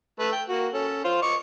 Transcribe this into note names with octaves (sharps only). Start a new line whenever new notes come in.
A3 B4
G5
A#3 F#4
C#4 A4
F4 C5
D#5 C#6 D6